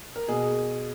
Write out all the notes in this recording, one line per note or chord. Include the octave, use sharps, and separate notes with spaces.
A#4
B2 G#4